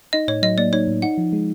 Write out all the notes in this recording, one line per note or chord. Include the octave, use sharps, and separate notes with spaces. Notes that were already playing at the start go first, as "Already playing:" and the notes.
D#4 D#5
A2 C#5
F#3 D#5
A#3 D5
D#4 C#5
A2
D#4 F#5
F3
G#3